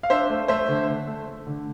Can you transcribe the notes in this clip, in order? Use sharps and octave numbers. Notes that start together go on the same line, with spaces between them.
F5
D4 C5 E5
A3
A3 C5 E5
D3
A3
A3
A3
D3